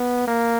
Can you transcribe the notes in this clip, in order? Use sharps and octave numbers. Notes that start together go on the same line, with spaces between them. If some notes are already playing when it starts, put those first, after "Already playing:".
Already playing: B3
A#3